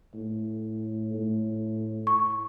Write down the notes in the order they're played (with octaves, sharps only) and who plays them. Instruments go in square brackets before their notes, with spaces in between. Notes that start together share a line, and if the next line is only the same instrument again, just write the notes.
[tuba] A2
A2
[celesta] C#6